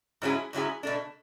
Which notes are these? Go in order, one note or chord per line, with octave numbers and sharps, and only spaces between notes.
G#2 F#3 C#4 E4 G#4
G#2 F#3 C#4 E4 G#4
B2 A3 D4